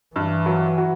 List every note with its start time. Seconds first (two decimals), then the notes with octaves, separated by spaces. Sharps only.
0.16 G2 E3
0.46 F#3
0.78 F#4